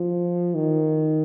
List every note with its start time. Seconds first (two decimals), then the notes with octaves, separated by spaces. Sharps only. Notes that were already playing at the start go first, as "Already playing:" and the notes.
Already playing: F3
0.55 D#3